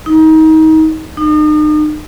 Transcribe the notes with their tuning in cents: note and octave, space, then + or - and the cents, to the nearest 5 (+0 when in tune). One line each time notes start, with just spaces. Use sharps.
D#4 +25
D#4 -40